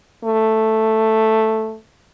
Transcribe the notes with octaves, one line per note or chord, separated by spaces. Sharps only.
A3